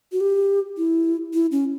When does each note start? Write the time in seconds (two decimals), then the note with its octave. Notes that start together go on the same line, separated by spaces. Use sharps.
0.12 F#4
0.21 G4
0.77 E4
1.33 E4
1.52 C#4